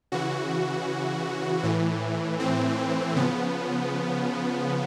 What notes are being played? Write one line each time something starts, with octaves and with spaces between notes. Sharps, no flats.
C#3 E3 F#4
A2 E3
C4
C#3 F3 B3